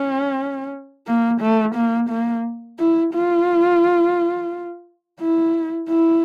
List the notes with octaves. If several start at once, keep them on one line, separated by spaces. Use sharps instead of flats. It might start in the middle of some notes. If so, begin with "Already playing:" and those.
Already playing: C#4
A#3
A3
A#3
A#3
E4
F4
E4
E4